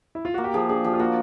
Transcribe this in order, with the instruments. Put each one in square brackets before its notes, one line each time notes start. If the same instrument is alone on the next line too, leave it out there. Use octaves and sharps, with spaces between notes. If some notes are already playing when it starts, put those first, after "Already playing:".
[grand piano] E4
F4
[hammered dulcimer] A#3 [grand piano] F#4
[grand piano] G4
[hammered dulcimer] F3 [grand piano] G#4
[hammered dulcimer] D4 [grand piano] G#4
[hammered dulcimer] F3 [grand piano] G4
[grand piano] F4
[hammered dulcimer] A#3 [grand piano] F#4